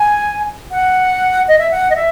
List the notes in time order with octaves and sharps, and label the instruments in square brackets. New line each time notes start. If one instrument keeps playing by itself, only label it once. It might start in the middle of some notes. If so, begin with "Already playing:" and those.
Already playing: [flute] G#5
F#5
D#5
E5
F#5
D#5
E5